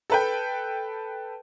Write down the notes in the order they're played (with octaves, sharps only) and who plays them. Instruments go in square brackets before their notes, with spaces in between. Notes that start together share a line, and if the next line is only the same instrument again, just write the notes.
[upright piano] A4 B4 G5